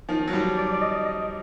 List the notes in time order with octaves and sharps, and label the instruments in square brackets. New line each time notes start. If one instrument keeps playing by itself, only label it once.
[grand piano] D#3 F3
F#3
F3 G3
[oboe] D5
D5
D#5
D#5